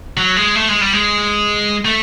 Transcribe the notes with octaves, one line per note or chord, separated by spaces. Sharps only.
F#3
G#3
A3
G#3
G3
G#3
A3